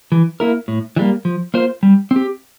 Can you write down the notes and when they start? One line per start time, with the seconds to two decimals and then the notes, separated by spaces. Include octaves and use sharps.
0.12 E3
0.40 A#3 E4 A#4
0.68 A2
0.96 E3 G3 A#3
1.25 F3
1.54 A#3 F4 C5
1.83 G3
2.11 C4 G4